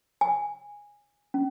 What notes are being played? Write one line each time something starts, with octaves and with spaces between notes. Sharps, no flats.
G#5
C#4